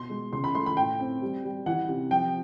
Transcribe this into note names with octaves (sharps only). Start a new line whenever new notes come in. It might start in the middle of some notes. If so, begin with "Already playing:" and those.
Already playing: B2 C6
G#3
C#3 C6
B5
A3 C6
B5
A2 G5
C4
G3
G3
E3 F#5
C3
F3 G5